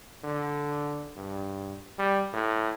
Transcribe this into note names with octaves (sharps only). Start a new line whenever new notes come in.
D3
G2
G3
A2